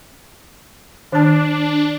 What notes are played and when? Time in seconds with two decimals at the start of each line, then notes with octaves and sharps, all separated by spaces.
1.12 D#3 D4 A5